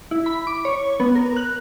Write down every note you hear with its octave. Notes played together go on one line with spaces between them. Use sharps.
E4
B5
D6
C#5
B3
A#4
F#6